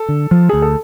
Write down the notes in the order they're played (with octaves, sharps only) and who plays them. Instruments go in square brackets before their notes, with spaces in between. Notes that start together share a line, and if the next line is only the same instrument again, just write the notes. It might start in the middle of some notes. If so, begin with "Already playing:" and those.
Already playing: [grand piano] A4
[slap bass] D3
F3
[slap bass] D2 [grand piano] G#4
[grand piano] A4